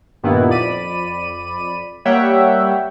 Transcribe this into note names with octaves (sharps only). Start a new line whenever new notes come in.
G2 A#2 D#3 A#3 B3 E4
F2 D5 B5 D#7
G3 A#3 C#5 E5 F#5 G5